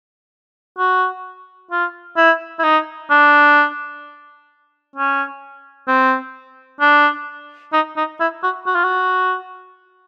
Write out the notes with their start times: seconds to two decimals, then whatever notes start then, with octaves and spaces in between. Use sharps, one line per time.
0.78 F#4
1.71 F4
2.17 E4
2.59 E4
2.64 D#4
3.10 D4
4.96 C#4
5.88 C4
6.81 D4
7.73 D#4
7.97 D#4
8.20 E4
8.43 F#4
8.66 F#4
8.75 F4
8.84 F#4